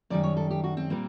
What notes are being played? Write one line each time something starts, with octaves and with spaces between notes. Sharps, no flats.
F#2 D#3 G3 D5
C#5
A4
G4
F#4
C4
A#2 G3 A#3